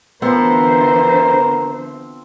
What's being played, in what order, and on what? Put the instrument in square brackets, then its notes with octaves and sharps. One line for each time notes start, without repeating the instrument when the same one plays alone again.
[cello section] D3 E3 C5 [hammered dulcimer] F3 C4 [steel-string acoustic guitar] B3 [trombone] A#4